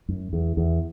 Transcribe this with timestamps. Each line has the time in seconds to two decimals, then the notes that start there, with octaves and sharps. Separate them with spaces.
0.08 F#2
0.33 E2
0.57 E2